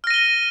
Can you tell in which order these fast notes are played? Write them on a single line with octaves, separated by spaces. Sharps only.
F6 A#6 D#7 G7